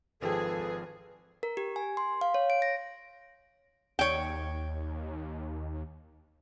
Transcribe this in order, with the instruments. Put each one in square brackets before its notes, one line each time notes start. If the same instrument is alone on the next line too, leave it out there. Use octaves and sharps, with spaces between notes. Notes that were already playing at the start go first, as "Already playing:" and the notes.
[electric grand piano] G#1 F3 G5 [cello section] G#4 [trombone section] A4 [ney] B4
[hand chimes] A#4
G4
G#5
C6
F5
C#5
D7
A#6
[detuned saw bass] D#2 [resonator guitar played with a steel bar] C#5 G5